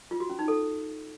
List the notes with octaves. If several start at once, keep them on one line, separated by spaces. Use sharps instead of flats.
F4
F#4
C#4
D#4
A4